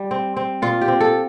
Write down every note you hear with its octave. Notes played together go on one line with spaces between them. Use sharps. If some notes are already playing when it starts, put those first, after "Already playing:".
Already playing: G3
C4
C4
A#2 F4
G4
C4
A4